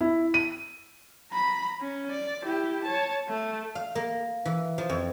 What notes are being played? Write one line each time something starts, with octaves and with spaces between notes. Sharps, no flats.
E4
D#7
A#5 B5
C#4
D5
E4 G4
C#5 A5
A3
F5
A#3
E3
F3
F2